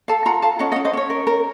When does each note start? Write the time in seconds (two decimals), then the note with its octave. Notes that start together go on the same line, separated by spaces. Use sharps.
0.08 A4 F5 A5
0.26 F4 F#5 A#5
0.42 A4 F5 A5
0.59 C#4 D#5 F#5
0.72 D#5 F#5
0.76 C#4
0.85 C5 D#5
0.93 C#4 C#5
1.10 A#4
1.27 A#4